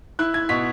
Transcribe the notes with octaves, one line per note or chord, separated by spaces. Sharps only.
E4 F#6
G#6
B2 B6